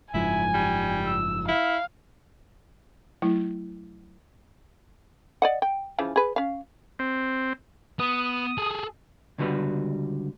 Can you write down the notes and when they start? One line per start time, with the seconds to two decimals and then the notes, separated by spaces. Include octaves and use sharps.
0.14 F#1 G#2 F3 E4 G#5
0.54 G3
1.06 E6
1.49 E4 F5
3.22 F#3 A3 E4
5.42 D5 D#5 F#5
5.62 G5
5.98 C#3 E3 F3
6.16 G#4 B4
6.36 C#4 F5
6.99 C4
7.99 B3 D#6
8.58 G#4 A4
9.38 C#2 D3 G3 F#4 B4